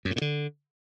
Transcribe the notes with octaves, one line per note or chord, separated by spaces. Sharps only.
F#2
A2
A#2
D3